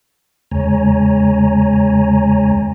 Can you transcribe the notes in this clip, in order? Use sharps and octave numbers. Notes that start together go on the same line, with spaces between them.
E2 C#3 G#3 C#5 G#5 A#5